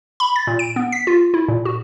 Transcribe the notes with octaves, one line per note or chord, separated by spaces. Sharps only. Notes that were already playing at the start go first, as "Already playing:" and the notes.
B5
A6
A#2
D7
B3
B6
F4
E4
A#2
F#4